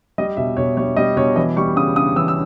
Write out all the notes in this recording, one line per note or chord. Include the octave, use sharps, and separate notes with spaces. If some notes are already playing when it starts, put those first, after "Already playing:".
G3 D#5
B2 E5
B2 C#5
G3 C#5
G3 D#5
B2 C#5
E3 D#5
G3 C#6
C#3 D#6
C#3 D#6
E3 E6
E6